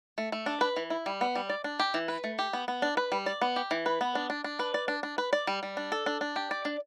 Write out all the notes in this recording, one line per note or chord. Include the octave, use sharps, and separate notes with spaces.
A3
A3
D4
B4
E3
E4
G3
B3
G3
D5
D4
G4
E3
B4
A3
G4
B3
B3
D4
B4
G3
D5
B3
G4
E3
B4
B3
D4
D4
D4
B4
D5
D4
D4
B4
D5
G3
G3
D4
A4
D4
D4
G4
D5
D4